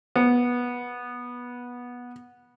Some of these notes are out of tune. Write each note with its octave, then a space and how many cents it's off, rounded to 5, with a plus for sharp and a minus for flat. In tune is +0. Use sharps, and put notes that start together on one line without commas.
B3 -15